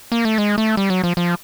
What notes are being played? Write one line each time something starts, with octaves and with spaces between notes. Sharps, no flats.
A#3
A3
G#3
A3
G3
F#3
F3
F3